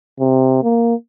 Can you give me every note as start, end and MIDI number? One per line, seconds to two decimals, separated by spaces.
0.19 0.61 48
0.63 0.94 58